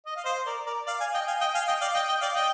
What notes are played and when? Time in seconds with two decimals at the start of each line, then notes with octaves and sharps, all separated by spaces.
0.06 D#5
0.16 F5
0.25 C5 D#5
0.46 A#4 D5
0.66 A#4 D5
0.87 D5 F5
1.00 F5 G#5
1.14 D#5 G5
1.27 F5 G#5
1.41 D#5 G5
1.55 F5 G#5
1.68 D#5 G5
1.81 D5 F5
1.94 D#5 G5
2.08 D#5 G5
2.21 D5 F5
2.35 D#5 G5